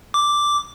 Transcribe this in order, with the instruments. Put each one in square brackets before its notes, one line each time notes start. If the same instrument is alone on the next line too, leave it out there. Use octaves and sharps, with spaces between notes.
[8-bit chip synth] D6